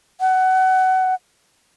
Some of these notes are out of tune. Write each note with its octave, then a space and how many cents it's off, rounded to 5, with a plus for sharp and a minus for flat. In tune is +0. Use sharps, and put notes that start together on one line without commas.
F#5 +20